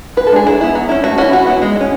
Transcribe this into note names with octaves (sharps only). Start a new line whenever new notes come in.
E3 B4
A4
G#3 D4 G#4
F#3 E4
B3 E4
F#3
C#4 E4
A3 F#4
C#4 E4 F#4
E3 F#4
B3 E4
G#3
E4
C#4